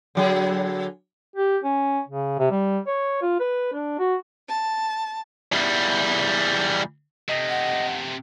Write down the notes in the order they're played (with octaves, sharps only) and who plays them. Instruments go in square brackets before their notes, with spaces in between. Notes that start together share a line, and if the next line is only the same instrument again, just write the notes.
[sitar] D3 F#3 G#4
[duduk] G4
C#4
C#3
C3
G3
C#5
F4
B4
D4
F#4
[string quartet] A5
[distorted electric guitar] E2 G3
[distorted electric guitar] C3 A3 [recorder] D#5
[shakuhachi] F#5